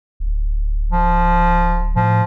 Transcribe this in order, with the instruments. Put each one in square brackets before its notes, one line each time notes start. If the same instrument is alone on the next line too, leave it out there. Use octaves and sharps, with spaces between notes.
[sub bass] D1
[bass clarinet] F3
[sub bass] A2 [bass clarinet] F3